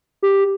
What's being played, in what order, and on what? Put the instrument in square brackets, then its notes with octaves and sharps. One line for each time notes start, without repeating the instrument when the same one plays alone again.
[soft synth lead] G4